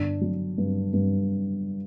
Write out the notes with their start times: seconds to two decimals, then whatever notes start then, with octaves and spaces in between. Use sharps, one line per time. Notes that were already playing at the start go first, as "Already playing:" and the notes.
Already playing: G1 D4
0.21 F#3
0.58 G2
0.93 G2